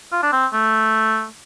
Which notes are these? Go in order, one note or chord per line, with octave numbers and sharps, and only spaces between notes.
F4
D4
C4
A3